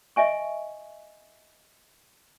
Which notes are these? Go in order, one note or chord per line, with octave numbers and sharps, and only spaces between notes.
D#5 E5 G#5 C#6